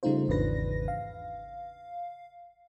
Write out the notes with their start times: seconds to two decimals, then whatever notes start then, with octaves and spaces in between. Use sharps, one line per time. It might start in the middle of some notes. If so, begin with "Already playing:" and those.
0.03 C#3 G3 A3 D#4 F4 C5
0.28 G#1 E2 C#3 D4 B4 A#6
0.88 F5